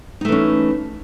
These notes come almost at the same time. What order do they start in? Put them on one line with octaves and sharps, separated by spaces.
D#4 A3 E3 C#4